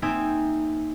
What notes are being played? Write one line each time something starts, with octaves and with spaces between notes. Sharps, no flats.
A#3 C4 D#4 E5 G5 G#5